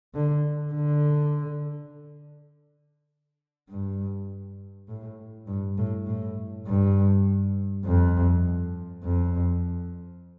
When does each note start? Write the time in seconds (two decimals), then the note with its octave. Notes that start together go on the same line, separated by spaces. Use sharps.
0.14 D3
0.74 D3
3.69 G2
4.88 A2
5.47 G2
5.78 A2
6.07 A2
6.67 G2
7.85 F2
9.04 F2